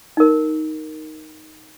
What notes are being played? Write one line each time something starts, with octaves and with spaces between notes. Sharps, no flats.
D#4 A#4